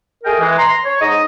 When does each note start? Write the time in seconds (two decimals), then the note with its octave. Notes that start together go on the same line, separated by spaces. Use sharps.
0.24 A3 G#4 A#4 D#5 G5
0.40 E3 G#3
0.58 A#5 C6
0.85 C#5
1.01 G#2 D#5 A#5